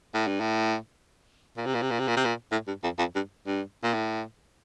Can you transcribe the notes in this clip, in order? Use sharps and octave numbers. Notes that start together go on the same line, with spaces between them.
A2
G2
A2
A#2
C3
A#2
C3
A#2
C3
A#2
C3
A#2
A2
G2
F2
F2
G2
G2
A#2
A2